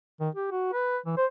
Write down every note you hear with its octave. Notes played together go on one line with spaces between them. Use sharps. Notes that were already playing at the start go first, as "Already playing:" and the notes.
D#3
G4
F#4
B4
E3
C5